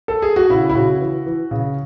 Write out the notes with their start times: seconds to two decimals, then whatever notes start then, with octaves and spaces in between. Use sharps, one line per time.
0.08 A4
0.22 G#4
0.36 F#4
0.49 C#3 E4
0.70 E4
0.75 C#3 F#4
1.00 E3
1.26 E3
1.51 C#3